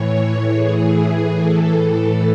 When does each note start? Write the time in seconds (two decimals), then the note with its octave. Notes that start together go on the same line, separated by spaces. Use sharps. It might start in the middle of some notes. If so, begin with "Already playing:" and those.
Already playing: A2 E3 C#5
0.51 G#4
1.35 A4
1.77 A4